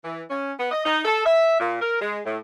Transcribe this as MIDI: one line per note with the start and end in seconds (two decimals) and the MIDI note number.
0.04 0.22 52
0.30 0.52 61
0.58 0.67 59
0.71 0.83 75
0.84 1.00 63
1.05 1.24 69
1.25 1.60 76
1.60 1.78 46
1.81 1.99 70
2.01 2.19 56
2.25 2.38 45